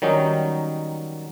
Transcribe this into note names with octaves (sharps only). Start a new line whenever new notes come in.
D#3 F#3 G3 C#4 D#4